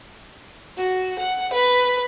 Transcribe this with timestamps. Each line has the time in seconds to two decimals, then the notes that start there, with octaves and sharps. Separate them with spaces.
0.77 F#4
1.19 F#5
1.53 B4